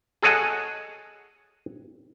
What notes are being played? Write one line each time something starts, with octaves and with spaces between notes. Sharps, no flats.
G#4 A4 C#5 D#5 F#5 G#5